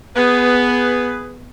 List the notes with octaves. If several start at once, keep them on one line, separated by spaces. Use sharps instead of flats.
B3 G#4 B4